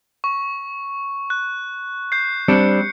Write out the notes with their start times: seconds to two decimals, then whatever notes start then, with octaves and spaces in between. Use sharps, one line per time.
0.24 C#6
1.30 F#6
2.12 G6 C7
2.48 G3 C4 D4 C#7